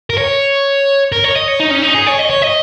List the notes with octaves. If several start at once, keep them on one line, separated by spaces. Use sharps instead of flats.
A#4
C#5
A#4
C#5
D#5
C#5
D#4
C#4
D#4
G#4
C#5
D#5
C#5
D#5